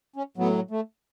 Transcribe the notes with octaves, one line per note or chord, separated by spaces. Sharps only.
C#4
A2 F#3 B3
A3